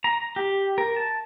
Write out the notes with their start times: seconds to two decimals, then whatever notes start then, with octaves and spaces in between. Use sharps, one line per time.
0.04 A#5
0.36 G4
0.78 A#4
0.96 A5